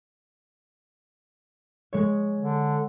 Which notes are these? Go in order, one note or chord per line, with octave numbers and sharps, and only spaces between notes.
G#3 C#5
D3